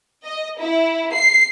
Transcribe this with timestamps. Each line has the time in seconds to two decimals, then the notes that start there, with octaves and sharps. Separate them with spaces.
0.25 D#5
0.60 E4
1.14 C7